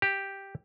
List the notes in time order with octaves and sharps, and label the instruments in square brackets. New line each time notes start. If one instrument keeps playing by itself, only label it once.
[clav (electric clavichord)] G4